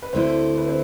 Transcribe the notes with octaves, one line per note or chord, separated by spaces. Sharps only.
B4
D2 D3 A3 C4 E4 C5
B4
C4 C5